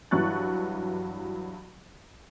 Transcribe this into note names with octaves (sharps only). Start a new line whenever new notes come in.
G2 E3 F#3 C#6 F#6 A6